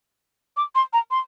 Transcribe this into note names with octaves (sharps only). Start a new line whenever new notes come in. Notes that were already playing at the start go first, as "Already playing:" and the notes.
D6
C6
A#5
C6